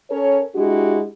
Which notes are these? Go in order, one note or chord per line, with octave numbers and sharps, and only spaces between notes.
C#4 A4 A#4 C#5
G#3 D4 E4 F#4 G4